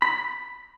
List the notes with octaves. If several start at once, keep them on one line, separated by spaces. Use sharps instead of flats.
B5